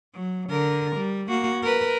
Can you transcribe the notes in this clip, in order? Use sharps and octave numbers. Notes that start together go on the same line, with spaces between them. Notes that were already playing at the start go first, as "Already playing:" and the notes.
F#3
D3 A#4
G3
A#3 F#4
A#4 B4